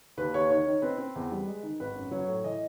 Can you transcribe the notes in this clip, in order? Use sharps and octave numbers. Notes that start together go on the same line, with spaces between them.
D#2 B4
D#2 C#5
D#3 C#5
D#3
C4 B4
C4
E2
G3
G#3
D#3
G#1 B4
F#2
F#3 C#5
A2
E3 D#5